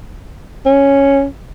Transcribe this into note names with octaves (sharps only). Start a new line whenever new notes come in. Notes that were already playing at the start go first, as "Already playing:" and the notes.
C#4